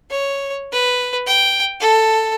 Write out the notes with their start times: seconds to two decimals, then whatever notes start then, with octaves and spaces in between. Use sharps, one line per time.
0.11 C#5
0.72 B4
1.27 G5
1.80 A4